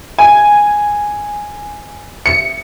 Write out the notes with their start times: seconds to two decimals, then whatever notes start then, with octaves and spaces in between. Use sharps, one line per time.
0.19 G#5
2.26 C#7